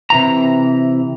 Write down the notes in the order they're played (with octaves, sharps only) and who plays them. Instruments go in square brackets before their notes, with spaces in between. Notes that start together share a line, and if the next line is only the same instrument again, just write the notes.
[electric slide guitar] C3 E3 A#5